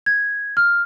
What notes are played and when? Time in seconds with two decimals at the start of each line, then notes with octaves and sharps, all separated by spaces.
0.06 G#6
0.57 F6